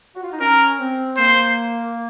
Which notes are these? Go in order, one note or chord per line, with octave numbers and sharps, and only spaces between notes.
F#4
F4
D#4
C#4 A#4
C4
A#3 C5